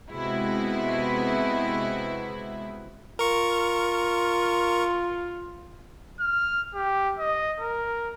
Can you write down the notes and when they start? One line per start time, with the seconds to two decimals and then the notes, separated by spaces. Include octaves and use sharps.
0.12 C3 G#3 B3 E4 F#4
3.19 F4 A#4 C#6
6.20 F6
6.75 G4
7.19 D#5
7.60 A#4